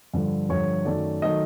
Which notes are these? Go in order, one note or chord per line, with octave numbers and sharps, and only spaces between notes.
G2 D3 F3
G2 D3 F3 C#5
F#2 D#3 F#3 A3 D5
D#3 F#3 A3 D#5